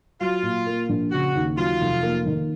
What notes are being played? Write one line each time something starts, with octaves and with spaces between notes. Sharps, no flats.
F#3 F4
A#2
A#3
A#1
C#3 F#4
D#2
F#3 F4
F1
A#3
D#3